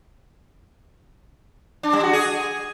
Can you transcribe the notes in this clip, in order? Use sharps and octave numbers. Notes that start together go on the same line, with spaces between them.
D4
G3
F#4
G#4